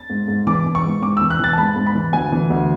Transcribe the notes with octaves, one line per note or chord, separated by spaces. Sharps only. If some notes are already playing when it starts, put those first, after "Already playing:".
Already playing: A6
G#2
G#2
E3 D6
E3
C#6
G#2
G#2 D6
E3 E6
F#6
E3 A6
A5
G#2 B5
G#2
B5
E3
D2 G#5
E3
D2